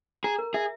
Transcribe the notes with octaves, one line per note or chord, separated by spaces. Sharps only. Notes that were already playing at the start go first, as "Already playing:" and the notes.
G#4 A#5
A#4
G#4 E5